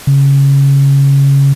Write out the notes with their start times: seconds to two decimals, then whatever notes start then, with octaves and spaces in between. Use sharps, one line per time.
0.07 C#3